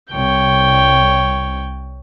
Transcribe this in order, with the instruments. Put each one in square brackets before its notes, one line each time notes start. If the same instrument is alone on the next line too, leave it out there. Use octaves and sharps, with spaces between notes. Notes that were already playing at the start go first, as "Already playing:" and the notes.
[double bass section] C2 [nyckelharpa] C#5 G5